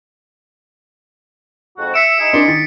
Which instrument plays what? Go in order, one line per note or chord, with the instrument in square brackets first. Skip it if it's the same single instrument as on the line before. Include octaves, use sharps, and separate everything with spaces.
[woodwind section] F2 G#2 F#4
[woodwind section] E5 [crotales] B6 C#7 D7 [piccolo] E7
[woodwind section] D#4 E4 G#4
[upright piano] D4 [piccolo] C6
[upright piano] D#3 [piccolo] A6